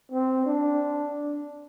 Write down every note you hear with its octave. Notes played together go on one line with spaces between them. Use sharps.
C4
D4